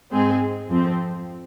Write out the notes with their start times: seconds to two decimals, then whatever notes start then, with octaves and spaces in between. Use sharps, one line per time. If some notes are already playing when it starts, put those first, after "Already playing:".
0.11 G#2 G#3 C4 G#4
0.69 F2 F3 C4